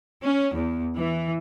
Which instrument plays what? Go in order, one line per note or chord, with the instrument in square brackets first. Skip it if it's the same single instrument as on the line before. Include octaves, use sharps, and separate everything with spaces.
[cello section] C#4
E2
E3